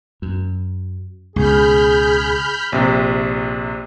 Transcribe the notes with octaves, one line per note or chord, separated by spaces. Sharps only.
F#2
C#2 B2 G#4 B5 F6 G6
A#1 C3